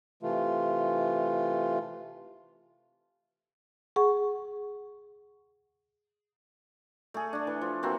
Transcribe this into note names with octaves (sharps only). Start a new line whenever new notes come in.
C3 E3 A3 F4
G#4 F#5 C#6
A3 G#4
A3 D4
E3
F3
E3 A#3 C4 F#4